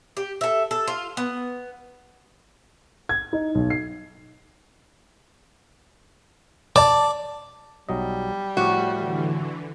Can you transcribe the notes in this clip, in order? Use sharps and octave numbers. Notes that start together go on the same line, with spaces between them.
G4
A4 E5
A4
F4
B3
G#6
D#4
B1
C7
D5 A5
B1 F#3 G3 D#5
A2 F3 A3 F#4
D3 E3